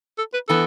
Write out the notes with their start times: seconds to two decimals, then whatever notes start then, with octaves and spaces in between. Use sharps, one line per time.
0.18 A4
0.33 B4
0.48 E3 B3 A4